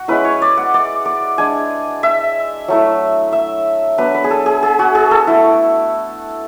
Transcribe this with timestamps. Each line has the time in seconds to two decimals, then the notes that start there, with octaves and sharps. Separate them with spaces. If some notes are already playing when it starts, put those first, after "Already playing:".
Already playing: F#4
0.08 G#3 C#4 E4 B4
0.25 C#5
0.42 D5
0.57 F#5
0.74 D5
1.05 D5
1.38 G#3 D4 G#5
2.03 E5
2.68 F#3 A3 E4
3.32 E5
3.98 F#3 B3 D4 B4
4.15 B4
4.24 G#4
4.31 A4
4.46 G#4
4.63 G#4
4.79 F#4
4.95 G#4
5.11 A4
5.27 A3 E4